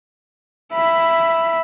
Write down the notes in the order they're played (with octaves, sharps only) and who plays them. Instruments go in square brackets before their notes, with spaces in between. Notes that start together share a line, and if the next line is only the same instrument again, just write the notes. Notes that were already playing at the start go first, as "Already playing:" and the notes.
[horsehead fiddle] E5 B5